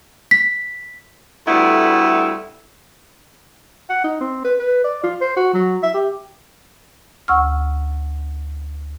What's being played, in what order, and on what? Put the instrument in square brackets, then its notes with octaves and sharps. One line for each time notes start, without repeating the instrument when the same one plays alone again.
[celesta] B6
[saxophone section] D2 G3 A3 B3 E4
[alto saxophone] F#5
D#4
C4
B4
B4
D5
F4
C5
F#4
F#3
E5
G4
[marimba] D2 F#5 C#6 E6 F6